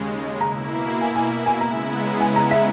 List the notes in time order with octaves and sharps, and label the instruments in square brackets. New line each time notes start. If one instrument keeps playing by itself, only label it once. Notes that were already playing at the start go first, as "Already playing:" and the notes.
Already playing: [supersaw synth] D#2 C#3 G#3
[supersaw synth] B2 A#3 E4 [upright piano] A#5
[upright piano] G#5
G#5
G#5
[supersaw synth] C#3 G#3 B3 E4 [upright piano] A#5
[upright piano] G#5
A#5
E5